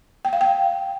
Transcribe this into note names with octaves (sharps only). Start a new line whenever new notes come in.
G5
F5
G5